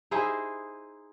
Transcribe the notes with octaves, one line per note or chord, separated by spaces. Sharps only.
D#4 E4 G#4 C5